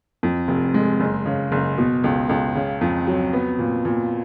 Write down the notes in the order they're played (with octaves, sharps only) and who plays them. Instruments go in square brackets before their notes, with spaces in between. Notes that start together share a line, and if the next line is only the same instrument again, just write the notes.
[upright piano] F2
F1
G#3
F#1
C#3
F#1
B2
C#2
C#2
C#3
F2
F#3
B3
A#2
A#2